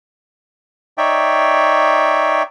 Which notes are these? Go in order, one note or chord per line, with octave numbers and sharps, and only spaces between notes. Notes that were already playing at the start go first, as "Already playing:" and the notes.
D#4 C#5 D5 E5 G5